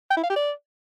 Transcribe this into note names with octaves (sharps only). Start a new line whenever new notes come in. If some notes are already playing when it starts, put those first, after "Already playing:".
G5
E4
F5
G4
D5